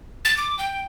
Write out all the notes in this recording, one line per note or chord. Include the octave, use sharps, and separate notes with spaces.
A6
D6
G5